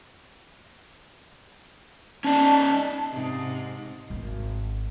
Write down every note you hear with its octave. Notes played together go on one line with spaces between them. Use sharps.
C#4 D#4 D5 A5
G#2 C3
G#1